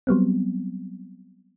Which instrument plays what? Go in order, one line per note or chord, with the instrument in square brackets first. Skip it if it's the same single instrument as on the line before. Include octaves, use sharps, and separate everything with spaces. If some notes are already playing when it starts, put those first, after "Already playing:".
[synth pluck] F#3 G3 B3 C4